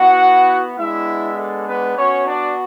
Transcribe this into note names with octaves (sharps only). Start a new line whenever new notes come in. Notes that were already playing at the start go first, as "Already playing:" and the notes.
Already playing: B3 E4 F#4 F#5
G#3 B3 D4 E4 E5
A4
B3 B4
B3 C#4 F#4 C#5
D4 D5